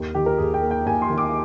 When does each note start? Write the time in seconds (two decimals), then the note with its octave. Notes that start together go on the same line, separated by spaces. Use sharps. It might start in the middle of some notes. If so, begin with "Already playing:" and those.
Already playing: D#2
0.15 D#3 G4
0.26 A#4
0.38 D#2 G#4
0.54 G5
0.62 A#3
0.71 G5
0.86 D#2 G#5
1.02 C6
1.10 D#3
1.18 D6